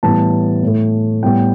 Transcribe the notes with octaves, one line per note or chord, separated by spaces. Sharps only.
A2 E3 G3 B3 A5
A2 A3
A2 G3 B3 G5